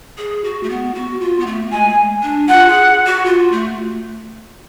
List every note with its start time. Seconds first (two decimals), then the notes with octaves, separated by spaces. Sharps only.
0.18 G#4
0.44 F#4
0.63 A3
0.70 B3
0.95 F#4
1.21 F4
1.40 B3
1.46 A3
1.72 G#3 G#5
2.23 D4
2.48 F4 F#5
2.68 G#4
3.06 F#4
3.25 F4
3.52 A3